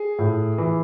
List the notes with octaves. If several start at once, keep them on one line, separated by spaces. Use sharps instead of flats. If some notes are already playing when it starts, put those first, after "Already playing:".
Already playing: G#4
A2
E3